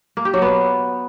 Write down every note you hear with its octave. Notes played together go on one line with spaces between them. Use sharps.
A#3
G4
F#3
B3